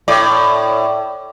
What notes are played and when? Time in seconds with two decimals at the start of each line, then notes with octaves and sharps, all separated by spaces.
0.08 A2 D5